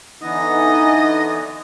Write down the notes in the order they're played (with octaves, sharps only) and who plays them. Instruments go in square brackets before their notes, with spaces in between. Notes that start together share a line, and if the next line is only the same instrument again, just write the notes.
[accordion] D3 E3 B3 [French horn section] D#4 [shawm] D#5